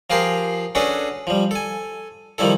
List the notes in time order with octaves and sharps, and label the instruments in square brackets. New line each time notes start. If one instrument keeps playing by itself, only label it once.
[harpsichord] F3 F4 G4 G#4 A#4 C5
C#4 D4 F#4 G#4 A4 B4
F3 G3
A4 G#5
D#3 F3 G3 E4 A4